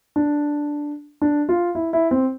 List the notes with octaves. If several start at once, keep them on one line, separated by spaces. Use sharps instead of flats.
D4
D4
F4
E4
E4
C4